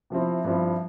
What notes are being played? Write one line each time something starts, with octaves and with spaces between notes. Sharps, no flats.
C3 F3 C4 E4
G2 F3 C4 E4